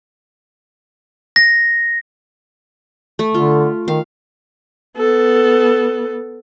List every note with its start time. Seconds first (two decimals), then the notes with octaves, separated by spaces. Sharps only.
1.36 A#6
3.19 A3
3.34 D3 F4
3.88 D#3 F5
4.97 B3 A4